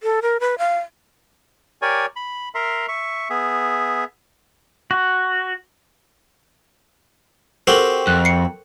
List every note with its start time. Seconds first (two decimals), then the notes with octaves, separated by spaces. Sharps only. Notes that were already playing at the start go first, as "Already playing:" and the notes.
0.03 A4
0.22 A#4
0.40 B4
0.58 F5
1.82 G4 A#4 C#5 D5 G#5
2.16 B5
2.55 A#4 E5 A#5 C6
2.88 E5 C#6
3.30 B3 G#4 E5
4.91 F#4
7.67 C4 F#4 G4 A4 A#4 F#7
8.07 F2 F#6
8.25 C7 C#7